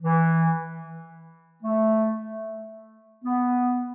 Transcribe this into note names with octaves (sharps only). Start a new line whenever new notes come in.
E3
A3
B3